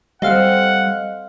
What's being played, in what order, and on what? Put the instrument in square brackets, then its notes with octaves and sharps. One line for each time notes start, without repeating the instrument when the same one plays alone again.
[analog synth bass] G3 [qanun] C4 A4 [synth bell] D#5 F5 F6 [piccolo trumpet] F#5